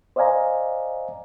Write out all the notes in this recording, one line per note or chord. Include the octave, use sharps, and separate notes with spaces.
C5 D5 D#5 F5 G#5 A#5